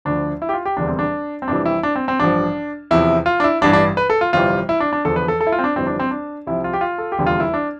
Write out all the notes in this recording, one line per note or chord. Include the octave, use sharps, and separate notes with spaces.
D2 D3 F3 D4
E4
G4
F4
G4
F1 E2 D3 G3 D4
C4
D4
C4
F1 F2 E3 G3 D4
E4
D4
C4
C4
A1 G2 F3 D4
E2 C3 F3 E4
F4
D4
E4
A1 G2 E3 D4
D4
B4
A4
F4
G1 F2 C3 E3 G3 F4
E4
D4
D4
E2 D3 F3 A4
B4
A4
A4
E4
F4
C4
D4
G1 F2 E3 G3 C4
D4
C4
D4
C2 C3 F3 E4
F4
G4
F4
A4
G4
F1 E2 D3 G3
F4
E4
D4